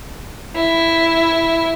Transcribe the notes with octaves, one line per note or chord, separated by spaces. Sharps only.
E4